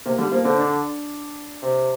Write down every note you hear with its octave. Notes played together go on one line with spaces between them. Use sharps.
C3 A#3
D3 G3
F3 A#3
D3 C4
D4
C3